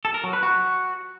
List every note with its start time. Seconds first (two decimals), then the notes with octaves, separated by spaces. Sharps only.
0.05 A4
0.14 A#4
0.24 F#3
0.33 B4
0.43 F#4